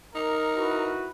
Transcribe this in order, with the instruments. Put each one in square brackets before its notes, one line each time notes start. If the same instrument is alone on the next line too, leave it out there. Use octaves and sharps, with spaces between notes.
[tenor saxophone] D#4 [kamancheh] A#4
[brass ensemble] E4 F#4 B4